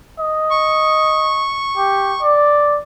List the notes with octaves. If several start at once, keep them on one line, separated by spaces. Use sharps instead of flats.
D#5
C#6
G4
D5